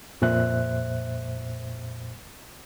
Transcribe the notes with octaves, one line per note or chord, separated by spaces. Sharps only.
F2 A#2 C5 E5 F#6